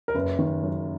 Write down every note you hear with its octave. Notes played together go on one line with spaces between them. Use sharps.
A#4
F#1 B4
D#3
F#2